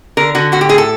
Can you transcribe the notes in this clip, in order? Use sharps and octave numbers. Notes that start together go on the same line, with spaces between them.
D3 A#4
D3 F#4
A2 F#4
G4
A2 G#4
A4